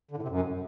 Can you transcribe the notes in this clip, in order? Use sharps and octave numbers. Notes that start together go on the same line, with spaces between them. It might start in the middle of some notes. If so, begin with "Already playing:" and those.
D3
A2
C3
F#2